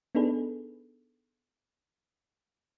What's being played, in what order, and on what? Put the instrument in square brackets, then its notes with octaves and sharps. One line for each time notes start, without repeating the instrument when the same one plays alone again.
[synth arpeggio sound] B3 D4 D#4 G#4 A4 B4